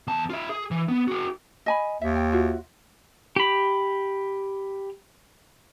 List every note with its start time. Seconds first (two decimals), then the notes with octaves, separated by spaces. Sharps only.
0.08 E2 A5
0.30 F4 E5
0.49 G#4
0.71 E3
0.88 B3
1.08 F#4 G#4
1.66 D#5 G#5 B5
2.02 D#2 E5
2.16 G5
2.33 F4 F#4 E5
3.36 G4 B5